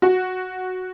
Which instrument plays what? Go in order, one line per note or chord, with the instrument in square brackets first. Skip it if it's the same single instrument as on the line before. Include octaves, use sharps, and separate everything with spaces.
[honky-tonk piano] F#4